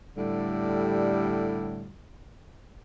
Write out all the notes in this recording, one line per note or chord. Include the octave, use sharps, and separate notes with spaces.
A2 D3 G3